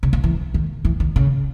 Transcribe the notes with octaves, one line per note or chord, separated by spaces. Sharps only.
C#3
C#3
E3
D#3
E3
D#3
C#3